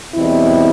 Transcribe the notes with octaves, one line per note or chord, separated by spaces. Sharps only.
E2 B2 G3 C4 E4